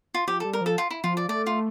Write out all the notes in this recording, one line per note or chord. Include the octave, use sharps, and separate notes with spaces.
F4
F3 G4
A4
G3
A#4
F3 A4
F4
E4
F3 F4
D5
A3 D5
F4